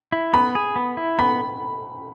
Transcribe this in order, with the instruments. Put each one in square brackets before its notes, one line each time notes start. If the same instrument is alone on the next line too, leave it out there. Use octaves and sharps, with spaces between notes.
[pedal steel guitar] E4
[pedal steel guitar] B3 [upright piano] B5
[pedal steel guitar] G#4
B3
E4
[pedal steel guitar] B3 [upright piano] B5